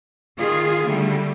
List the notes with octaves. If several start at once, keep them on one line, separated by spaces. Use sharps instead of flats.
D#3 F4 G#4
D3 G3 A3